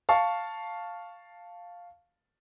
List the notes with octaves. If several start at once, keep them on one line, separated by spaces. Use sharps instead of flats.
F5 A5 C#6